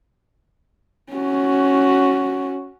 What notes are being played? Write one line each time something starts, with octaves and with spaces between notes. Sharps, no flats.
C#4 F#4